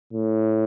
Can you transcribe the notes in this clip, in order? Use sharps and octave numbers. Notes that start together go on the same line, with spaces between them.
A2